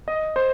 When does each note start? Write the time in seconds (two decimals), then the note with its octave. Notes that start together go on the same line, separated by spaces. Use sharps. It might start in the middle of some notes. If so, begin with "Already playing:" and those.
0.08 D#5
0.36 C5